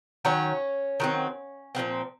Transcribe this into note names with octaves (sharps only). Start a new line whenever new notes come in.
D#3 F#3 C#4 C#5
D#3 F#3 C4
A#2 F3 A3 C4